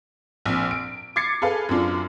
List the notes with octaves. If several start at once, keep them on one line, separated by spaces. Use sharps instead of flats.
A#1 C4
D7
D6 G#6 A6 C7 C#7
G#4 A4 B4 F5
F#2 C4 D4 F4